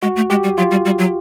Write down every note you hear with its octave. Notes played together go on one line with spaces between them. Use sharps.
G#3 F#4
A3
G#3 G4
G3
F#3 F4
G3
G3
F#3